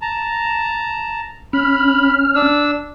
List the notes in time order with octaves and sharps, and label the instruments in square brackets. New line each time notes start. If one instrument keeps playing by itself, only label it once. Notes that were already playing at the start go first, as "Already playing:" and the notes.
[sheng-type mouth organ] A5 A#5
[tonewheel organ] C#4 F6 [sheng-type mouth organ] B5
[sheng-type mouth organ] D4 E6